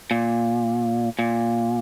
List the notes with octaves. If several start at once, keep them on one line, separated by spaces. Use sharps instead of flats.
A#2
A#2